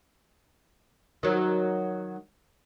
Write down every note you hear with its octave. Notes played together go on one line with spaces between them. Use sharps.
D#3 F#3